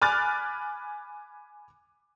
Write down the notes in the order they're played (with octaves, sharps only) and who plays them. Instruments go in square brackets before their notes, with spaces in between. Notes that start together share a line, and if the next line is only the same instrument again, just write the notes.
[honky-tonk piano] G#5 B5 D6 F6 F#6 A6